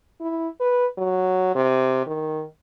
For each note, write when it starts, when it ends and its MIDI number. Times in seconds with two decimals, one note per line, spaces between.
0.21 0.48 64
0.60 0.86 71
0.98 1.52 54
1.55 2.04 48
2.07 2.43 51